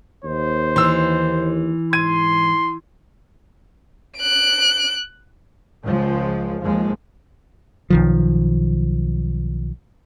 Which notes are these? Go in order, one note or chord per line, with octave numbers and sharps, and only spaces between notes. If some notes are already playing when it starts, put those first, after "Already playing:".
D#2 C5
E3 C6 E6
G#2 C6 G#6 D#7
F#6 D7
C#2 F3 G#3
D#2 F3 G#3
B1 D#3 F3